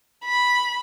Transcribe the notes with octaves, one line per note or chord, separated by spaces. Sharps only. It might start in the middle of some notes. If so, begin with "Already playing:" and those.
B5